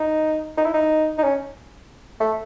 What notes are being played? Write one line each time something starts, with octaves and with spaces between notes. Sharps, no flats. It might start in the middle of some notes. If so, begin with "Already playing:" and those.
Already playing: D#4
D#4
E4
D#4
D#4
C#4
A3